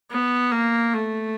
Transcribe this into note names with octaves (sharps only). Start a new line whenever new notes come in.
B3
A#3
A3